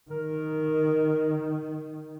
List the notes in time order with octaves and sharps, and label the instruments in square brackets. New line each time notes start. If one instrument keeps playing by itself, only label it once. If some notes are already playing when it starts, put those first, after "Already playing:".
[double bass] D#3 [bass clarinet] A#4